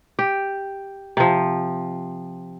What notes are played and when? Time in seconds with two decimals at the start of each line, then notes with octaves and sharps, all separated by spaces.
0.19 G4
1.17 C3 F3